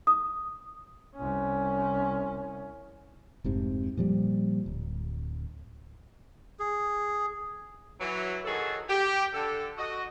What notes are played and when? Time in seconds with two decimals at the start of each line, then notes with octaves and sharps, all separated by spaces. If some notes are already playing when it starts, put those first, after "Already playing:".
0.07 D#6
1.16 C2 C#4
3.44 F1 G#2 C3
3.97 A#2 F3 G3
4.66 D1
6.59 G#4
8.00 E3 F#3
8.44 D#3 F#3 G#4 A4
8.88 G4
9.33 D3 A4
9.77 F#4 D#5